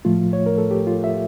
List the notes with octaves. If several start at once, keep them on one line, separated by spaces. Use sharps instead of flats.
A2 F3 A3 F4
C#5
A#4
A4
G4
F4
E5